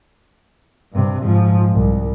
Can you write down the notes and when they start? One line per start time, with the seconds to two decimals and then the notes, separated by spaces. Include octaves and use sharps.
0.92 G2 C3
1.22 G#2 F3
1.73 C2